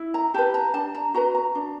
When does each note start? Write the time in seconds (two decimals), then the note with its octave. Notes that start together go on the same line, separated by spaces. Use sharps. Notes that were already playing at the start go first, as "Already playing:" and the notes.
Already playing: E4
0.14 A#5
0.34 G4 B4 A5
0.54 A#5
0.74 D4 A5
0.95 A#5
1.14 F#4 B4 A#5
1.35 A#5
1.55 D4